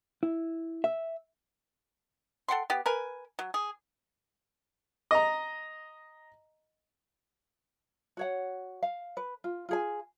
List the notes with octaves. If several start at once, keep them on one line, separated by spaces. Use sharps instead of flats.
E4
E5
A4 F#5 G5 C6
B3 G4
A#4 B4 G#5
F#3
G#4
D#5 A#5
F#4 C#5 F#5
F5
B4
F4
F4 G#4 G#5